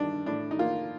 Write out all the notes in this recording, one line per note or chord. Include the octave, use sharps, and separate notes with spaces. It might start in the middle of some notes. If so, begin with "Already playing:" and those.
Already playing: G2 D#3 D4
A2 D4
D#4
A#3 F4